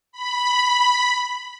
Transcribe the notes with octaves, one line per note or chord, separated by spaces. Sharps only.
B5